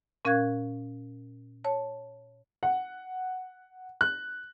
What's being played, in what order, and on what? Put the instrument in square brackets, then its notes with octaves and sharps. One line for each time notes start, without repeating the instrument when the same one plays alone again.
[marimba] A#2 C#4 A#4 F5 F#6 G#6
C#5 A5
[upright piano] F#5
F#6